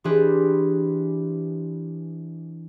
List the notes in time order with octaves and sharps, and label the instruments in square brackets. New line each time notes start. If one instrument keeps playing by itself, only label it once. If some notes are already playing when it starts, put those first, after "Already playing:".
[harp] E3 D4 G4 G#4 B4 C5